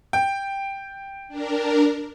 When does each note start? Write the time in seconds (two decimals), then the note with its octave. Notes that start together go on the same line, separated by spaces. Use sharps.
0.13 G5
1.28 D4 A#4